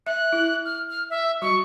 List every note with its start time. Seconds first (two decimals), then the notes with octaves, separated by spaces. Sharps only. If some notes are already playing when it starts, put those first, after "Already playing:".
0.06 E5 F#6
0.33 E4
0.65 F6
0.90 F6
1.10 E5
1.42 G3 F#4 C#6